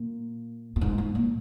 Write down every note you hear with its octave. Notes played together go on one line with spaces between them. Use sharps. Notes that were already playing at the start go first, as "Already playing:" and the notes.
Already playing: A#2
A#2
G#2
G#2
A#2